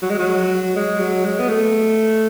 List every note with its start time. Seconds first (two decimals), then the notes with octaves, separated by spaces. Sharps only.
0.02 F#3
0.10 G#3
0.19 F#3
0.76 G#3
0.99 F#3
1.25 G#3
1.40 B3
1.49 A3